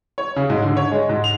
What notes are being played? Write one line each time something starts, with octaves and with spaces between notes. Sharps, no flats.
C#5
C#3
G#2
D3
C#5
G#3
G#2
F7